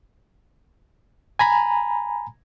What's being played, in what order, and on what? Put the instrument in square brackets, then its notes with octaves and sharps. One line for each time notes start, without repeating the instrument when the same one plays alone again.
[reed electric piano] G#5 A#5 B5